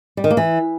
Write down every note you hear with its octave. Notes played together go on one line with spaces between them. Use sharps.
G3
D#3
A#3
E3